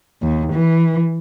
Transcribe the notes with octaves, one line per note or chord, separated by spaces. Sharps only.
D#2
E3